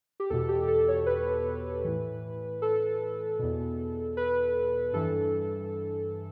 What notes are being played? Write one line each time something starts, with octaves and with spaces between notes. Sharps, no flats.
G4
E2 B2 A4
G4
A4
C#5
B4
A2 E3
A4
E2 B2
B4
G2 E3 A4